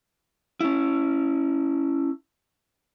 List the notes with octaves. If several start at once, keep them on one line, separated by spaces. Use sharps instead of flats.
C#4 E4